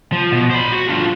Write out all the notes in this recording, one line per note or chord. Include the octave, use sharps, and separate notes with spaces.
F3
B2
C5 B5
F#4
D4 F4